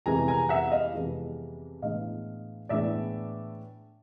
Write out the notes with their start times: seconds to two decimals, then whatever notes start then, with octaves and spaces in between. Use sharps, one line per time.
0.06 F2 C3 E3 G#3 B3 G#5 A#5
0.28 G#5 A#5
0.49 E5 F#5
0.72 D#5 F5
0.94 F2 C3 E3 G#3 B3
1.82 A2 E3 G#3 B3 D4 D#5 F5
2.69 A2 E3 G#3 B3 D4 D5 E5